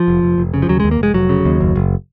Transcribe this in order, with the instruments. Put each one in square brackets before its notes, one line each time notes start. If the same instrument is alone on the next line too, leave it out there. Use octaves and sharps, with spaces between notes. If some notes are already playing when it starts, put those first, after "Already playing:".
Already playing: [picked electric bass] F3
F1
F1
F1
C#3
F3
D#2 F#3
G#3
D#2
A#3
F1 G#3
F1 F#3
C#3
D#2
F#1
F#1